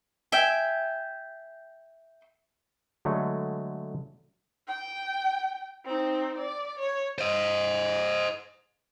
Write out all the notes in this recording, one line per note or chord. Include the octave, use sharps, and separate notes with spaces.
E5 G5 G#5
D3 F#3 G#3 A3
G5
C4 D#4
D5
C#5
C5 D#5